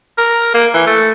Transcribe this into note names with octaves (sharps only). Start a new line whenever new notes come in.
A#4
A#3
E3
A3